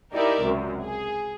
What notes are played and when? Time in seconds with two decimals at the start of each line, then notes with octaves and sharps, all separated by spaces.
0.12 D#4 E4 G4 A#4 D5 E5
0.42 C#2 F#2 C3
0.82 G#4